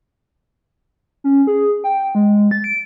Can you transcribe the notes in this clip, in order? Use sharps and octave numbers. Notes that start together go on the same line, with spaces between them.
C#4
G#4
G5
G#3
A6
D7